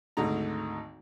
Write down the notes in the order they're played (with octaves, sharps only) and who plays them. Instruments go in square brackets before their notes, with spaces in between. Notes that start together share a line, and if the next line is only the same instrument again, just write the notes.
[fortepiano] G#1 D2 D3 D#4 A#5